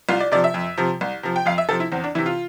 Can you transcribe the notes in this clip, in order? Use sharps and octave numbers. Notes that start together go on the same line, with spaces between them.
C2 F4
D5
C3 F3 D5
E5
F2
C3 F3
C2
C3 F3
G5
F2 F5
E5
C3 F3 A4
E4
E2 C4
D4
C3 E3 E4
F4